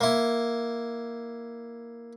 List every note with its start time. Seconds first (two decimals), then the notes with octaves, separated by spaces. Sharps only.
0.01 A#3 E4